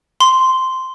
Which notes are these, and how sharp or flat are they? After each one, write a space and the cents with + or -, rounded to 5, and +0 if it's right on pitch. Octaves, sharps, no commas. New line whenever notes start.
C6 -10